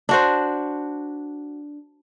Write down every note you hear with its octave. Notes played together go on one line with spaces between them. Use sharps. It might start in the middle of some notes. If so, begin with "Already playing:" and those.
D4 F#4 C5